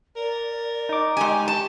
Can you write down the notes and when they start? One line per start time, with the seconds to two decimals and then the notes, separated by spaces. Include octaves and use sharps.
0.16 A#4 D5
0.89 D#4 D6
1.17 G#3 G4 G#5 C#6
1.48 A5